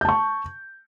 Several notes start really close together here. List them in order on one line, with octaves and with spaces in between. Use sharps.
G6 A5 C#6